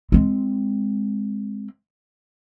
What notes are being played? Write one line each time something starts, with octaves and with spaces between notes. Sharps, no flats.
G#3 C4